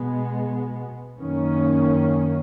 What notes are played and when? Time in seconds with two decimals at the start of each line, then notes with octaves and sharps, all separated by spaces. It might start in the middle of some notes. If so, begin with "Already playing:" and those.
Already playing: B2 G#3 B3
1.19 F#2 D#3 A#3 C#4